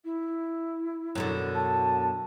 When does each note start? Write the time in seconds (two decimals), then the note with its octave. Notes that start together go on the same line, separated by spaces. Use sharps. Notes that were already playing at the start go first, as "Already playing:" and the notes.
0.05 E4
1.15 F#2 B2 D3
1.55 A5